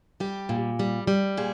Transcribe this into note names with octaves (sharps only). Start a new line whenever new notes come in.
G3 G4
A#2
G3
G3
A#2 G#4